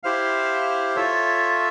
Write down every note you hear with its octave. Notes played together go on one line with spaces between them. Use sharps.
E4 G4 C5 F5
F4 A4 C#5 E5